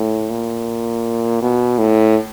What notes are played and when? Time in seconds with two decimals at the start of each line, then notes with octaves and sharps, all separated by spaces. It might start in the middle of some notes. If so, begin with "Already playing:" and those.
Already playing: A2
0.30 A#2
1.42 B2
1.79 A2